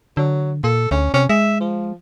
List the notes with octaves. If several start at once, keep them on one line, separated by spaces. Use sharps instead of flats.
D3 F#3
A#2 A4
D2 C#4
C3 C#4
G#3 E5
F3